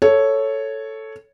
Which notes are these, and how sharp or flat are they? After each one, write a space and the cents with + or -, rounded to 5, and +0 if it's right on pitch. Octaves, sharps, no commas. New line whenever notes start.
A4 +0 C#5 +0